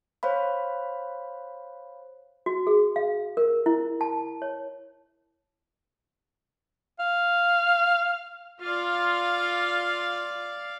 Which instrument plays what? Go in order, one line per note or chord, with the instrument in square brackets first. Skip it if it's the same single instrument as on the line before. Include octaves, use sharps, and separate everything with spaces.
[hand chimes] C5 C#5 F5 B5
[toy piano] F#4
G#4
F5
A#4
E4
A5
C#5
[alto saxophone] F5
[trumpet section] F4 [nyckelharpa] D5 F5